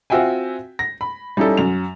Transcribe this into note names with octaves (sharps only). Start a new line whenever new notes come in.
C4 F4 F#4 E5 G5 G#5
A#6
B5
G3 C#4 D#4 E4 A4
F#2 F7